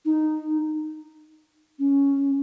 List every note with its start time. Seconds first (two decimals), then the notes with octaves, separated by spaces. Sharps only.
0.05 D#4
1.79 C#4